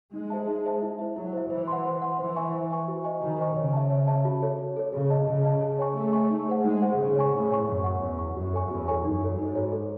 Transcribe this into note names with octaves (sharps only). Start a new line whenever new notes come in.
G#3 D#4
G#4 C5 E5 A5
D#4
G#4 C5 E5 A5
E4
C5 E5
F#3 E4
C5 E5
E3 C5
F#5 C6
C5
F#5 C6
E3 C5
E5 G#5 C#6
C5
E5 G#5 C#6
F#4
C5 D#5 G#5 C#6
D#3 F#4
C5 D#5 G#5 C#6
C#3 C#5
E5 A5
C#5
E5 A5
F#4
A4 C#5
F#4
A4 C#5
C#3 G#4
D#5 A5
C#3 G#4
D#5 A5
G#4
C#5 G#5 C#6
A3 G#4
C#5 G#5 C#6
D#4
G#4 C5 F#5
G#3 D#4
G#4 C5 F#5
C#3 G#4
C#5 G#5 C#6
A2 G#4
C#5 G#5 C#6
F#2 C#5
F#5 C#6
E2 C#5
F#5 C#6
F#2 F#4
A4 C#5 G#5 C#6
E2 F#4
A4 C#5 G#5 C#6
F#2 D#4
F#4 A4 C#5
G#2 D#4
F#4 A4 C#5
A4